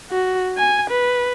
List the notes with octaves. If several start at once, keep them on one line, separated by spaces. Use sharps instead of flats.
F#4
G#5
B4